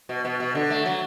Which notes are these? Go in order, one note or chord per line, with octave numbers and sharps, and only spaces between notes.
B2
B2
B2
D3
A3
F#3